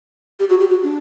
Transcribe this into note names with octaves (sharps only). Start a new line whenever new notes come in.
G4
F#4
G4
F#4
D4